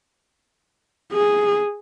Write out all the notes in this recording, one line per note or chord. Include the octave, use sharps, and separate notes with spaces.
G#4